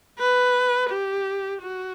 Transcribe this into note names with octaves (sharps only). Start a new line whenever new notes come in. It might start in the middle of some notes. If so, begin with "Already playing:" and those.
B4
G4
F#4